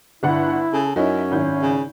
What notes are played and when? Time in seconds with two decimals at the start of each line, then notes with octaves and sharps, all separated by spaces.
0.23 G1 D4 E4 F#5
0.73 C#3 A4
0.96 F#2 C#4 D#4 E4
1.31 G#1 E4 G6
1.62 C#3